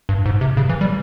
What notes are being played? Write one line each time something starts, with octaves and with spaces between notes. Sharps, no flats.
G2
G#2
C3
C#3
E3
G3